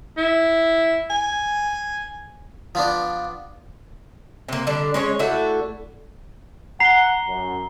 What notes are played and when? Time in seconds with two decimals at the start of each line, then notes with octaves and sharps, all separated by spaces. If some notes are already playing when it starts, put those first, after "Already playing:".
0.17 E4
1.10 G#5
2.75 F3 B3 D4
4.49 C3 A#3
4.67 D3 G3 D4
4.94 G#3 C#4 C#5
5.19 A3 D4 E4 F#4
6.80 F#5 A#5 C7 G7
7.28 F#2